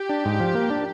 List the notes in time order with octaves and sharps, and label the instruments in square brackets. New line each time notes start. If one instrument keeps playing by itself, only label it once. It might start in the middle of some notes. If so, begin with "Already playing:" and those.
Already playing: [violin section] G4
[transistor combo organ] D4
G#2
F3
A#3
D4